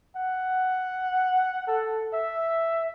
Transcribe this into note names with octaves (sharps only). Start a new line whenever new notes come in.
F#5
A4
E5